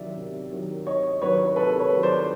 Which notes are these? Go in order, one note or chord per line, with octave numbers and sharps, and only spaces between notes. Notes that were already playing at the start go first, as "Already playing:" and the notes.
Already playing: C3 D#3 F#3 D5 E5
C3
D#3 F#3
C3 C#5 D#5
D#3 F#3 B4 C#5
C3 A4 B4
B4 C#5
D#3 F#3
C5 D5